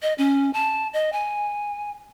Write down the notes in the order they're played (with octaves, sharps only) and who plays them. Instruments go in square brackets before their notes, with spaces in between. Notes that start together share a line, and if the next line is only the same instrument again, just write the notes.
[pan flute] D#5
C#4
A5
D#5
G#5